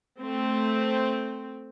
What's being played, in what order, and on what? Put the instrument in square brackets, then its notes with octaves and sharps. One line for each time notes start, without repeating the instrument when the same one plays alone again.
[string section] A3 C4